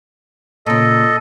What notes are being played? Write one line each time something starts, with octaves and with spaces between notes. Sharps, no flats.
A#2 C#3 A4 D#5